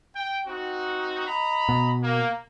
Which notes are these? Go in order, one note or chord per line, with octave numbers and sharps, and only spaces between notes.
G5
C4 D#4 F#4
D#5 A#5 B5
B2
A#3